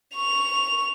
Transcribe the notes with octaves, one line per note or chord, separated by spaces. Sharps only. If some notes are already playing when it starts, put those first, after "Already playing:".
C#6 F7